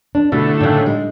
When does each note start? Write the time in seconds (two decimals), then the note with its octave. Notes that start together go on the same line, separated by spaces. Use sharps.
0.15 D4
0.32 B2 D3 A3 E4
0.60 A2 C#3 D4 D#4
0.86 G#3